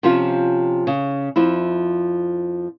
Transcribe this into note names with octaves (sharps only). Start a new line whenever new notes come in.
C3 F3 C#4 F4
C#3
F2 F3 E4